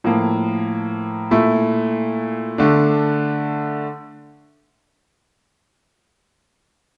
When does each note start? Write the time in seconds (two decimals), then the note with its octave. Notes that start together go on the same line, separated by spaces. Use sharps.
0.04 A2 F3 A#3
1.31 A#2 A3 E4
2.58 D3 A3 D4